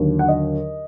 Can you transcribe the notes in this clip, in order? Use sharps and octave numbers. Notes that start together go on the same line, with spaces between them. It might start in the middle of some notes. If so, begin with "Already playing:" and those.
Already playing: D#2 D3 F#3
F#5
D#5